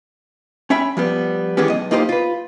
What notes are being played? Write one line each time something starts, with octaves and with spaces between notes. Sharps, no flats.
C#4 E5 G5 B5
F3 G3 B3
D#2 E3 G#3 B3 C#4 G4
B1 D#5
A#3 D#4 F4 G4 A#4 C5
F4 B4